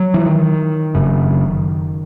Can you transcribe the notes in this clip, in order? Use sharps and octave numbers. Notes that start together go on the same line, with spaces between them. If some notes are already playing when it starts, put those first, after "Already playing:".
Already playing: F#3
E3
D#3
F#1 F#2 C#3